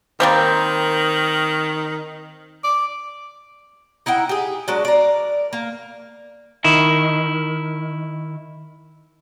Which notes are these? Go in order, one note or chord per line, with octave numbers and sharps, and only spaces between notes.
D#3 G3 A#3 C4
D5
D#4 E4 F#5 G5
G4 G#4
F#3 G#3 D4
A#4 D5
A#3
D#3 E4